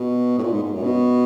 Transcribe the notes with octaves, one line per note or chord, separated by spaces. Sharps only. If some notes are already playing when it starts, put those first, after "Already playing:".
Already playing: B2
A2
A#2
G#2
G#2
F#2
B2